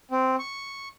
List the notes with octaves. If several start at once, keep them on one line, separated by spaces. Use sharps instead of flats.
C4
C#6